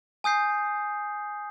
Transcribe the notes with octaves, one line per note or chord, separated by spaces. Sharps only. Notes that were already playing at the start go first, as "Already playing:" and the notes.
G#5 D#6 G6 C7